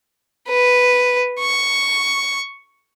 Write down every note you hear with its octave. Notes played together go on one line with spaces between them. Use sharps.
B4
C#6